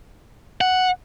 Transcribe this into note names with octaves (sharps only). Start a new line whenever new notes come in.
F#5